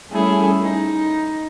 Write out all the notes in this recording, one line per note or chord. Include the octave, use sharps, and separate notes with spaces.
G3 A3 C#4 E4 G#4 A4
D#4